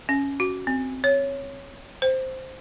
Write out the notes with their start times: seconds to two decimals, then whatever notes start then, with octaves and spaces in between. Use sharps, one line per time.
0.09 C#4
0.40 F#4
0.67 C4
1.04 C#5
2.02 C5